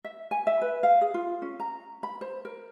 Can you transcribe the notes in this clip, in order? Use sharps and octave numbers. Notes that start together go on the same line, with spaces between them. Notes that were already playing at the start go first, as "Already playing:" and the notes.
E5
G#5
E5
B4
F5
G#4
F4
C#4
A#5
B5
C5
A#4